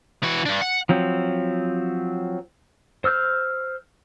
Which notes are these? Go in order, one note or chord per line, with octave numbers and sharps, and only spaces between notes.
E3 F#4
G2 D4
F#5
F3 F#3 C4
C5 E6 F6 G6